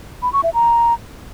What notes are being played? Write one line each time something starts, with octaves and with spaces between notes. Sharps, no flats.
B5
C#6
E5
A#5